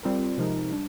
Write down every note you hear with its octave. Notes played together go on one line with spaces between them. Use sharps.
G3 C4 F4 A#4
C3 F3 G#3 D#4 A#4
G3 D4